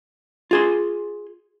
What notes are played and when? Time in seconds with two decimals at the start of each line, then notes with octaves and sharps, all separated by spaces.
0.51 F4 G#4 C6